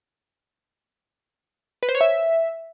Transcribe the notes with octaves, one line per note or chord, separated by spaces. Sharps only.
B4
C5
C#5
E5